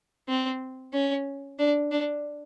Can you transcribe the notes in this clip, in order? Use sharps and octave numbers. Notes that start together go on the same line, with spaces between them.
C4
C#4
D4
D4